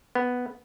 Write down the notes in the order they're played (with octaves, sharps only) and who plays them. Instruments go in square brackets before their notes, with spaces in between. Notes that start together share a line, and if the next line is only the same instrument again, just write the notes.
[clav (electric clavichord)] B3